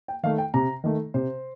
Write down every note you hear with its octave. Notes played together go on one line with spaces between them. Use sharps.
G5
D#3 A3 F5
G5
C3 A#5
D#3 A3
C3 C5